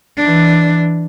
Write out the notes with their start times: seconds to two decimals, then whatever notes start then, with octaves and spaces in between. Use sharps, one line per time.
0.17 E3 D4